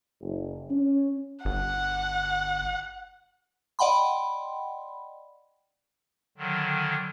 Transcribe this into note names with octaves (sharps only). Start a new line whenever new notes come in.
F#1
C#4
G1 F#5
D5 D#5 F#5 G5 B5 C6
D3 D#3 F#3